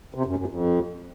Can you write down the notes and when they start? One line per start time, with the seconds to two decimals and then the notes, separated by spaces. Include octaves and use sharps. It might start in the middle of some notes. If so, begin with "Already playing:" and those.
0.14 C3
0.25 F#2
0.36 F#2
0.47 F2